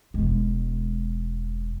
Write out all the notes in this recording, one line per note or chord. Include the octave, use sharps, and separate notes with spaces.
E1 G#3